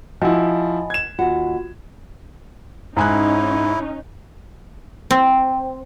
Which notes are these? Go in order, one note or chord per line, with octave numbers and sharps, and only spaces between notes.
F3 E4 F#4 D#5 G#5 B5
G#6 E7
D#2 F4 F#4 F#5
G#2 C#4 D#4 E4 G#5 F#6
C4